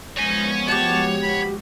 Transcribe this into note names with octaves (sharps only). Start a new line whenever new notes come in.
F3 G#3 B3 D#4 C#5 G#5
F#4 G4 C#5 A5
B5